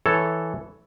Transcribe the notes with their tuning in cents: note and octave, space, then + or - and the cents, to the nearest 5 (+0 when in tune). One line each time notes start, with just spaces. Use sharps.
E3 +0 A4 +0 C#5 +0